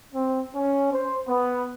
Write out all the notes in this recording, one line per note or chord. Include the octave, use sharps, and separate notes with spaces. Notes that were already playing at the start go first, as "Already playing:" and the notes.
C4
C#4
C5
B3